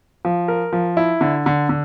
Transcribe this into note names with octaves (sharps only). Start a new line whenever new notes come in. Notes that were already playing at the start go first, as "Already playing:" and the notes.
F3
A#4
F3
E4
D3
D3
D3